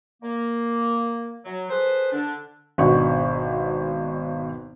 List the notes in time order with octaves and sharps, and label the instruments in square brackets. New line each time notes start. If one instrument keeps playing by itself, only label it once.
[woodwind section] A#3
F#3
G#4 A4 B4 C5
D3 D4
[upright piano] G#1 B2 D4 F#5 C#6